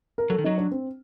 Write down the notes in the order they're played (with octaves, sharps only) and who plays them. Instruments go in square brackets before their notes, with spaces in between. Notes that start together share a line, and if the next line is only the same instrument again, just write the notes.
[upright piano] A#4
[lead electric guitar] F#3 [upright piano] A4
[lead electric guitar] D#3
[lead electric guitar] F#3 [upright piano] D#4
[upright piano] D4
C4